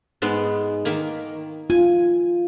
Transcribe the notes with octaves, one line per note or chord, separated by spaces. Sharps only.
G#2 G#3 B3
D#3 A#3
F4 G#5